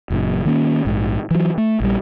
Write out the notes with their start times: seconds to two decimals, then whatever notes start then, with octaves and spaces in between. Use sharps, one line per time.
0.10 F#1 F#2 A#2
0.45 D#3 A#3 B3 C#4
0.85 A#1 G#2
1.31 E3 F#3
1.58 A3
1.80 A#1 G3